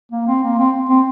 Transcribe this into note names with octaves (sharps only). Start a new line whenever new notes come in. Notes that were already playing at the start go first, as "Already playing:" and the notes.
A#3
C4
A#3
C4
C4